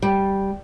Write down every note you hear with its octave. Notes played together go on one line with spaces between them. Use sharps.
G3